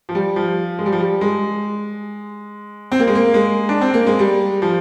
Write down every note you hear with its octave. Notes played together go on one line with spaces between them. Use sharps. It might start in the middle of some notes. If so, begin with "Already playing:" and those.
F3
G3
F3
G#3
G3
F3
G3
G#3
C4
A#3
G#3
A#3
G#3
D4
C4
A#3
G#3
G3
F3